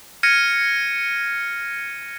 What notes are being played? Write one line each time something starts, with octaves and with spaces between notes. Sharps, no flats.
F6 G#6 A#6 C#7 D#7